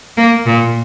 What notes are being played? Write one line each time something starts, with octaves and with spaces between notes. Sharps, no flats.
A#3
A#2